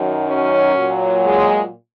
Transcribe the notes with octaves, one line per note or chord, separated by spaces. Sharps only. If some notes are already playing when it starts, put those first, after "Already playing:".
Already playing: F#2 D#3 F#3
C#4
A#2 F#3
G#3